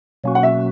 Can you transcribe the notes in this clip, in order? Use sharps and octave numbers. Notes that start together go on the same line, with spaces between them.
B2 F#3 A#3 C#4 F#4
F#5
E5